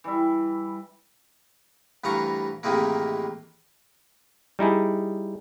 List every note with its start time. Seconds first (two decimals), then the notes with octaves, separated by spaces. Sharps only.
0.04 E3 G3 E5
2.04 D2 G2 E3 F5 A#5 C#6
2.63 A2 C3 D#3 E3 G#3 A#3
4.59 G3 D#4 E4 G#4